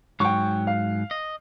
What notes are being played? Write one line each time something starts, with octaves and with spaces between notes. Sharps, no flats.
G#2 F#3 G5 C#6
F5
D#5